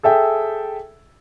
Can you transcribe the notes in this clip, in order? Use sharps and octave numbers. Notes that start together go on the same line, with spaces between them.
G#4 A4 E5 G5